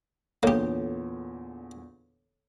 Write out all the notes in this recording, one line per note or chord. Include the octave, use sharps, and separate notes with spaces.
E2 A#2 D3 A#3 G4 A4 C#5